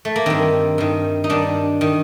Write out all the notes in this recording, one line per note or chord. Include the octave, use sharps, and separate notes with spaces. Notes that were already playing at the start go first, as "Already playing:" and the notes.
A3
A#3
G2 D#3 C4
G2 D#3
D#4
G2 D#3 D4
D#3